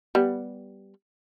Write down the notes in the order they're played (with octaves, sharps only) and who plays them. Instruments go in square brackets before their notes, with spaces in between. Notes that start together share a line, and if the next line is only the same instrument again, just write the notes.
[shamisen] G3 B3